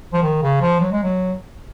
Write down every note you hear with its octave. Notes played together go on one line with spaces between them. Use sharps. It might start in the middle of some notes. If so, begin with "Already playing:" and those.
F3
D#3
C#3
F3
F#3
G#3
F#3